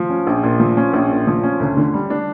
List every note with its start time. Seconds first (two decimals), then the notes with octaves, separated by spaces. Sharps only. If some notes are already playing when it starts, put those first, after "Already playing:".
Already playing: F3
0.10 C#4
0.27 A#1
0.43 A#2
0.60 F3
0.77 C#4
0.93 A#1
1.10 A#2
1.27 F3
1.43 C#4
1.60 D2
1.77 D3
1.94 G3
2.10 D4